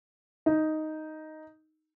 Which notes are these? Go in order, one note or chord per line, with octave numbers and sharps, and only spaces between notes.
D#4